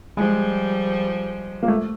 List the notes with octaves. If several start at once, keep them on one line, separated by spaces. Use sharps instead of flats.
F3 G3 G#3
A#3
A3